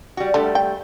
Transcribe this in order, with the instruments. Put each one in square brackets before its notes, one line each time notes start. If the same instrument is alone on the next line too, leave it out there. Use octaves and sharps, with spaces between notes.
[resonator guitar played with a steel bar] G3 F#4
[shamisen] D3 [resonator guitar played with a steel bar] G3 A3
[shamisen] G5